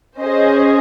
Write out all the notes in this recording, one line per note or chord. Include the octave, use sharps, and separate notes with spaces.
C#4 G#4 C5 D#5